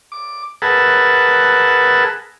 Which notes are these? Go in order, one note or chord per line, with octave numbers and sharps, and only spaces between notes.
D6
G#4 A#4 B4 F#5 A5 E6